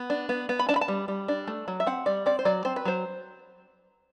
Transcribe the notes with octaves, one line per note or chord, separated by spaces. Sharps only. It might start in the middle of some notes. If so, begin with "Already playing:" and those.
Already playing: B3
D4
B3
B3
B5
D4 A5
B5
A5
G3
G3
D4
A3
F#3
E5
C4 F#5
G3 D5
C4 D5
C5
F#3 D5
C4 C5
B4
F#3 C5